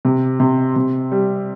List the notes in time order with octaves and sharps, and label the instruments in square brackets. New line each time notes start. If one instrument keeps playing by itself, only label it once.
[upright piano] C3
C3
C3
G3